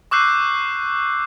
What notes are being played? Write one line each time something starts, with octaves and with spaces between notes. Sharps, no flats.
C#6 D6 E6 F#6 G6 C7